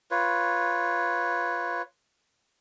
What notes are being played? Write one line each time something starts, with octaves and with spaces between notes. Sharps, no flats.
F4 B4 C#5